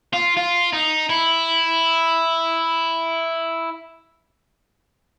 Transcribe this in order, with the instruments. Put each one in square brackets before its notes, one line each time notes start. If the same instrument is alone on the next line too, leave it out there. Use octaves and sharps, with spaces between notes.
[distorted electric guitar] F4
F4
D#4
E4